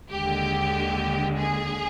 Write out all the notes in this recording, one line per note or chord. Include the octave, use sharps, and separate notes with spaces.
D#2 D3 G#3 G4
G#4